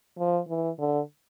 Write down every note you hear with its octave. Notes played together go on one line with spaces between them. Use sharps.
F3
E3
D3